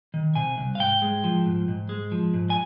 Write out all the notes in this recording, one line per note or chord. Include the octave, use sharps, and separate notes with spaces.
D#3
C3 G#5
C2
F5
G#2 G5
G#3
F3
G#2
G#2
G#3
F3
G#2
G#5